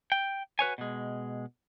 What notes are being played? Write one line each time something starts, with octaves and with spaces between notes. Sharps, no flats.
G5
F#4 B4 C#5 G#5
B2 G#3